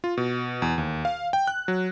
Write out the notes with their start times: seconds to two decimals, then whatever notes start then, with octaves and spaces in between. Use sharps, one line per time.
0.04 F4
0.17 B2
0.62 E2
0.78 D#2
1.05 F5
1.33 G5
1.47 F#6
1.68 F#3